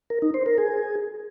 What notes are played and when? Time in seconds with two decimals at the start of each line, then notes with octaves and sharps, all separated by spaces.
0.10 A#4
0.22 D#4
0.34 C5
0.46 A#4
0.58 G#4